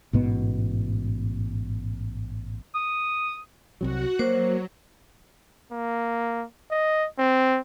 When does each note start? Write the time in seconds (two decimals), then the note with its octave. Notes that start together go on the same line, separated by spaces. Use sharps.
0.13 A1 G#2 B2 B3
2.75 D#6
3.81 C2 C3 F#3 F#4 F#5
4.19 F#3 A#3 C5
5.72 A#3
6.71 D#5
7.19 C4